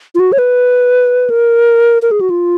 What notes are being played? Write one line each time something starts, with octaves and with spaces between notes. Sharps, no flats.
F4
F#4
C#5
B4
A#4
A#4
G#4
F#4
F4